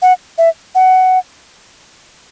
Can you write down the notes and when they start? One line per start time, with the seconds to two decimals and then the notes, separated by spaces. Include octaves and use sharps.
0.02 F#5
0.38 E5
0.75 F#5